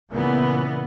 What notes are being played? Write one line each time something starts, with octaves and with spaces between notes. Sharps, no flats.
A#2 C#3 E3 B3